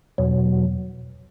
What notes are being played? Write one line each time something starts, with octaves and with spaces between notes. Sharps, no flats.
E2 B2 F#3